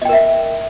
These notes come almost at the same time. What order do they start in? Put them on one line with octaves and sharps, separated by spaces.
D#5 G5 A#4 E5